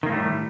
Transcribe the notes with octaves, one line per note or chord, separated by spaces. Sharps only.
A2 D#3 G3 A3 A#3